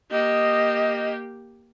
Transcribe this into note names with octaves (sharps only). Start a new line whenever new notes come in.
A#3 G4 D#5